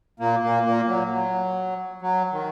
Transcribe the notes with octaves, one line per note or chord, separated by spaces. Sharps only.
A#2 A#3
A#2 A#3
A#2 A#3
F#3
F#3
F#3
D#3